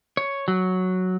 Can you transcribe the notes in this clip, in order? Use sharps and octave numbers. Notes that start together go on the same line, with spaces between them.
C#5
F#3